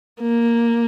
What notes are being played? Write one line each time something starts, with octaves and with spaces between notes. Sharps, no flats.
A#3